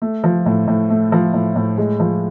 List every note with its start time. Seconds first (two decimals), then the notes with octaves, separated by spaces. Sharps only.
0.02 A3
0.24 F3
0.46 A2
0.67 A2
0.90 A3
1.12 F3
1.34 A2
1.56 A2
1.78 G#3
2.00 F3